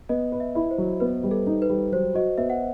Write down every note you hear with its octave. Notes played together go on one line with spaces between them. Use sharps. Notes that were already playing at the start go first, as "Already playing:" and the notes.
B3 D#5
B4
E5
E4
C5
F#3
B3 B4
G3
A4
D#4
B4
G3
F#3 C5
F#4 D#5
B3 E5
F#5